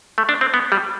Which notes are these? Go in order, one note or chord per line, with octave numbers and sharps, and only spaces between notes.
A3
D4
C4
B3
G3